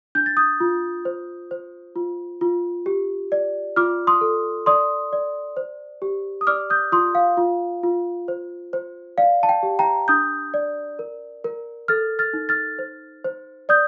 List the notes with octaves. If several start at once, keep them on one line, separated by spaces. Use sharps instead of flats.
D4 G6
A6
D#6 G6
F4
C5
C5
F4
F4
G4
D5
F4 D6 F6
C6 D#6
A4
D5 C6 D#6
D5
C5
G4
D#6
D5 D6 F6
D#6 G6
F4 C6 D#6
F5
F4
F4
C5
C5
D5 F5
A5
G5
G4
G5 A#5
D4 D#6 G6
D5
A#4
A#4
A4 F6 A6
F6 A6
D#4
F6 A6
C5
C5
D5 D#6 G6